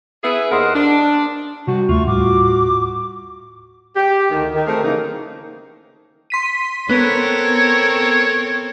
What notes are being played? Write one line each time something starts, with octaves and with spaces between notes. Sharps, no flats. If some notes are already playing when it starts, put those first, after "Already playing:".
B3 E4 G#4
D#2 A#4 C5 D#5 F#5
D4
C3 G3 F#4
D#2 A3 F4 C#6
D#2 A2 G3 F#4 D6
G4
D2 D#3
D#3
A3 C4 G#4 A#4
C#3 E3 F#3 A#3 D#4
C6 B6 D#7
B3 C4 A4 A#4 C#5